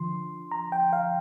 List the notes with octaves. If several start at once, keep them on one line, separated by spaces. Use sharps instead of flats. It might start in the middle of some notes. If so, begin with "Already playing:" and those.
Already playing: D3 F3 C6
A#5
G5
F5